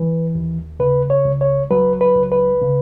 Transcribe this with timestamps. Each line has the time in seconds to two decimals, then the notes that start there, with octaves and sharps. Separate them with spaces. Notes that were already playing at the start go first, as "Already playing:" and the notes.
Already playing: E3 B4
0.35 D#2
0.80 C#3 B4
1.10 C#5
1.25 C#2
1.41 C#5
1.71 F#3 B4
2.01 B4
2.16 C#2
2.32 B4
2.62 C#3